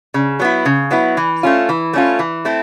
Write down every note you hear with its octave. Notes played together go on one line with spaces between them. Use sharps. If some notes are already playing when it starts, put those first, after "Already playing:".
C#3
F#3 B3 E4
C#3
F#3 B3 E4
E3
A3 C#4 F4
E3
A3 C#4 F4
E3
A3 C4 E4